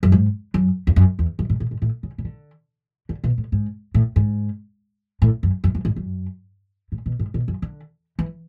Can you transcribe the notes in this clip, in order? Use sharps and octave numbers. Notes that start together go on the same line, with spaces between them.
F#2
G#2
F#2
E2
F#2
E2
F#2
G#2
A2
G#2
A2
C#3
C#3
D3
D3
B2
A2
G#2
A2
G#2
A2
F#2
F#2
F#2
G#2
F#2
A2
B2
G#2
B2
F#2
D3
E3